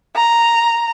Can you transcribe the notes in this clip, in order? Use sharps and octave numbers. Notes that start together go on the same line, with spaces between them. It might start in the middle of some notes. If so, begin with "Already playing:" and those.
A#5